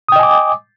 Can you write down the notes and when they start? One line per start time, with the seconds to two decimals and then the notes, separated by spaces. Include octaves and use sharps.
0.09 D#6
0.12 G5
0.16 D#5
0.19 G#5
0.23 D6